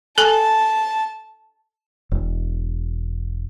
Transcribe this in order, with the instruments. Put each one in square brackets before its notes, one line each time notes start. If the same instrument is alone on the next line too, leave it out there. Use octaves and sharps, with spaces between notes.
[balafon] A4 G#5 [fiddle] A5
[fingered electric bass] E1